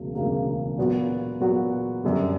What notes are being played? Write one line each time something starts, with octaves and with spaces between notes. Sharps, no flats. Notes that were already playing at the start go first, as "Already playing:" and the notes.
Already playing: E1 D2 C#3 F#3 A#3
E1 D2 C#3 F#3 A#3
A#2 F#3 B3 F#4
A#2 F#3 B3 F#4
F#2 D3 G3